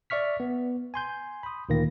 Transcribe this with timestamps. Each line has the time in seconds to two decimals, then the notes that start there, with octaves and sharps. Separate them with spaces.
0.10 D5 E5 C#6 F6 B6
0.40 B3
0.94 G#5 C6 G6
1.43 B5 D#6
1.69 D2 A#2 D#3 A#3 A#6